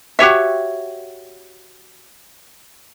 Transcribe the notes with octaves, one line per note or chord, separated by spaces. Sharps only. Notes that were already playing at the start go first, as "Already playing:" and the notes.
F#4 G4 C#5 E5